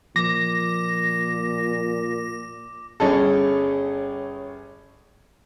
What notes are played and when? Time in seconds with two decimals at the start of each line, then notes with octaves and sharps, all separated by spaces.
0.16 A#2 F3 D6 A#6
3.00 G1 C#4 G#4 A4